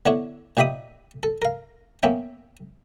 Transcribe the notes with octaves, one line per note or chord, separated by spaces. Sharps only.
D3 B3 D4 E4 C#5
A#2 D#3 G4 E5 B5 D#6
A4
A#4 F5
A#3 B3 C#4 E5 G5